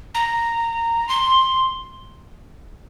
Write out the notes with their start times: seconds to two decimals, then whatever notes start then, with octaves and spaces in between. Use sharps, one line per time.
0.15 A#5
1.09 C6